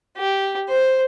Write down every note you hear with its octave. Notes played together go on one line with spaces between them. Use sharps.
G4
C5